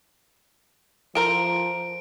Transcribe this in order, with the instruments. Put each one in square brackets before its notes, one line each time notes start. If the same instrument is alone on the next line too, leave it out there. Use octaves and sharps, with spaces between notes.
[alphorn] F3 [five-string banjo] A4 A#4 C5 [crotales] D7